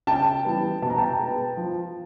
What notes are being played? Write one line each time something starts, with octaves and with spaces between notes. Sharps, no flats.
C#3 G5 A5
E3 G3 B3
B2 A5
A#5
G5 A5
G#3 B3
F3